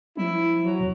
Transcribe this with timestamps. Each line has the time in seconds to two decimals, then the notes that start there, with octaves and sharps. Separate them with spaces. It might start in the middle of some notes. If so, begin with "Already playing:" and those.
0.17 F3 E4
0.63 F#3
0.80 E2